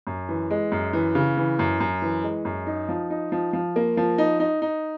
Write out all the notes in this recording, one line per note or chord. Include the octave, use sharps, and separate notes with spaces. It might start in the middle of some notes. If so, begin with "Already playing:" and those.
F#2
E3
G#3
F#2
E3
C#3
E3
F#2
F#2
E3
G#3
F#2
D#4
F3
D#4
F3
F3
A#3
F3
D#4
D#4
D#4